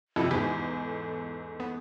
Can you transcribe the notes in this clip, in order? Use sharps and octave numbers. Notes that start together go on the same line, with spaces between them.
F2 C3 E4 F#4 A4
E2 G#2 G4 A4
B3